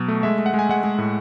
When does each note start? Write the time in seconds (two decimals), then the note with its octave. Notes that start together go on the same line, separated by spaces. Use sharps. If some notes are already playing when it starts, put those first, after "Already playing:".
Already playing: B2 F#3
0.08 A3
0.23 G#3 E5
0.38 G#3
0.46 F#5
0.54 G#3
0.59 G#5
0.69 G#3 F#5
0.84 G#3
0.98 A2